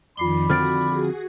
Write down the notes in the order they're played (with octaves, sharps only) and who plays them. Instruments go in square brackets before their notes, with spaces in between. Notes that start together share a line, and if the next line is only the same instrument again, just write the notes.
[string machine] F2 D#3 [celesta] F4 C7 G7 [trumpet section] D5 B5
[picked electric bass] D3 F3 C4 [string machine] F#4 [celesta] F6 A6 D7
[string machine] F#4 G#4